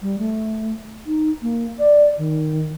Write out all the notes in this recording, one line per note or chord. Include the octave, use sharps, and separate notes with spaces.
G3
A3
D#4
A#3
D5
D#3